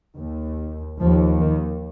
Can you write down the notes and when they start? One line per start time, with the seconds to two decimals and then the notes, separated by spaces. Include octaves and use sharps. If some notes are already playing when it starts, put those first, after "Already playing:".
0.18 D#2
1.00 D#2 F3
1.40 D#3